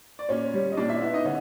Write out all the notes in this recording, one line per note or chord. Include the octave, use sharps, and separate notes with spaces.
D5
A#2 C#4 C#5
G3
D#5
A#2 D4 D5
E4 E5
B3 E4 E5
D#4 D#5
D3 C#4